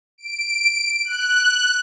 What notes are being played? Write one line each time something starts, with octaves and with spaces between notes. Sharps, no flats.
D7
F#6